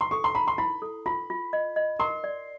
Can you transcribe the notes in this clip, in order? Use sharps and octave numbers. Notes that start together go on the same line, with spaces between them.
C6
A4 C#6
C6
A#5 B5
C6
E4 B5
A4
F4 B5
F4
D#5
D#5
A#4 C6
D5